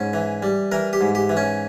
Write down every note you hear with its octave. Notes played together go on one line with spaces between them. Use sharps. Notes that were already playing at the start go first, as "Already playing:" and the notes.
Already playing: G#2 C#4
E3
G3
E3 A#4
G4
G#2
G4
E3
C#4